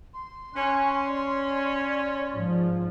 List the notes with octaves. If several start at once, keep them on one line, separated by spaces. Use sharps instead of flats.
C6
C#4 G#5 F#6
D5
G#2 F3